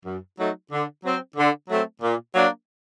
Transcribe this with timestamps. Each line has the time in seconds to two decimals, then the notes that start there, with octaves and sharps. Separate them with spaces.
0.05 F#2
0.38 F#3 A3 D#4
0.71 D3
1.04 F#3 C4
1.36 D3
1.69 F#3 A3 C4
2.02 A#2
2.35 F#3 A#3 D4